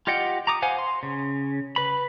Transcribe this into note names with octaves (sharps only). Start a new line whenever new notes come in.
F4 G4 D#5 F#5 G5
A#5 D6 D#6
C5 F5 F#5 G#5
C6
C#3
B4 B5